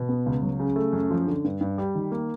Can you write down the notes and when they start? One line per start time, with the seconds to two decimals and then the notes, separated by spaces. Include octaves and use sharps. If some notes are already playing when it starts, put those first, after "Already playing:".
Already playing: B2
0.09 B3
0.26 C#2
0.42 F#3
0.60 C#3
0.76 A3
0.93 F#2
1.11 F3
1.27 D3
1.44 G2
1.61 G2
1.78 G3
1.95 D#3
2.12 A#3